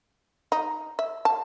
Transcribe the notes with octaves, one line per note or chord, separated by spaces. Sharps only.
D#4
E5
A5